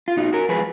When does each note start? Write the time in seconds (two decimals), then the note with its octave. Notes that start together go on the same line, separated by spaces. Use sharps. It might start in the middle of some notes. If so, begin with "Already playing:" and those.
0.08 F4
0.17 A#2 D#4 F#4
0.33 F#4 A#4
0.49 F3 G#3 G#4 B4